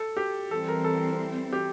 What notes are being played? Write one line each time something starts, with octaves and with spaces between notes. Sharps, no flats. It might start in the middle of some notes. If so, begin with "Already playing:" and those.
Already playing: A4
G4
E3 G3 C4 A4
A#4
A4
G4